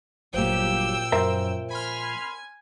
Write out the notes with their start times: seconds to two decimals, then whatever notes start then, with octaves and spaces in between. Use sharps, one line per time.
0.34 G1 A#2 F3 F#3 G4 G5 E6
1.12 F#2 A#4 C5 E5
1.70 G#5 B5 C6 F6